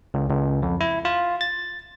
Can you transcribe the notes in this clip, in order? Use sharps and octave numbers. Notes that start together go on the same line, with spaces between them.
C#2
C#2
F2
E4
F4
A6